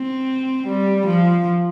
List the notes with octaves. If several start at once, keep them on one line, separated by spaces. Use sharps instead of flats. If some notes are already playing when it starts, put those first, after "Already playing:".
Already playing: C4
G3
F3